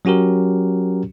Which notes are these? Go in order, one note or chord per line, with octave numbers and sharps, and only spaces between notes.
F#3 C#4 F#4 G4 A#4